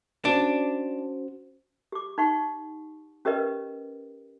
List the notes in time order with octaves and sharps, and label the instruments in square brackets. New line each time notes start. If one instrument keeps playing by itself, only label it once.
[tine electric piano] C#4 F#4 C5 [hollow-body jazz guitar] D4
[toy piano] G4 D6
D#4 F#5 C#6
C#4 G4 A#4 B4 D#5